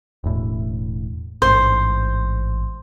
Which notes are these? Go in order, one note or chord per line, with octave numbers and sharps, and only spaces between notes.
E1 A2
A1 G#2 C5